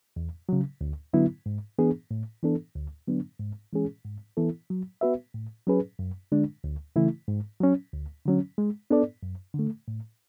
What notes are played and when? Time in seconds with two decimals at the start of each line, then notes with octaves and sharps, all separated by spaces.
0.16 E2
0.49 C#3 F#3
0.81 D2
1.14 D3 F#3 B3 E4
1.46 G#2
1.78 E3 B3 D4 G#4
2.11 A2
2.43 E3 B3 D4 A4
2.75 D2
3.08 D3 F#3 B3 D4
3.40 G#2
3.73 E3 G#3 C#4 G#4
4.05 G#2
4.37 E3 B3 E4 A4
4.70 F#3
5.01 B3 F#4 B4 E5
5.34 A2
5.67 F#3 C#4 G#4 B4
5.99 F#2
6.32 D3 G#3 D4
6.64 D2
6.96 C#3 E3 A3 E4
7.28 G#2
7.60 F#3 C#4
7.93 D2
8.26 D3 F#3 C#4
8.58 G#3
8.90 B3 D4 A4 D5
9.23 F#2
9.54 D3 A3
9.88 A2